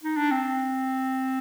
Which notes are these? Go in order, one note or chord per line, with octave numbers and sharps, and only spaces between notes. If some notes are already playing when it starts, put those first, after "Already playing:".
D#4
D4
C4